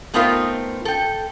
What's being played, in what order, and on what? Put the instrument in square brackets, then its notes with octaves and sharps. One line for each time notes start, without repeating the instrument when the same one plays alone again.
[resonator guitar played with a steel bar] A3 B3 C4 D#4 F4 A#4
A4 G5